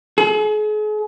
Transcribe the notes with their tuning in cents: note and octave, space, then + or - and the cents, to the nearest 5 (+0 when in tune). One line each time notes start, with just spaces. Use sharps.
G#4 +40